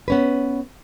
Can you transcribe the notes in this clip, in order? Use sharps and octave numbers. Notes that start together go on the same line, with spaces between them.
B3 C#4 B4